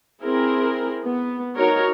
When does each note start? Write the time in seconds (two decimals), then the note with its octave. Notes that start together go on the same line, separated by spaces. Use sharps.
0.22 C4 E4 G#4 A#4
1.04 B3
1.57 D#4 F#4 A#4 C#5